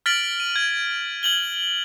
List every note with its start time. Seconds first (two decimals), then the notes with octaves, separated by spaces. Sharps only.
0.06 F6 A6 B6 D7 F#7
0.40 D#7
0.56 G#6
1.23 G#6 F#7 G7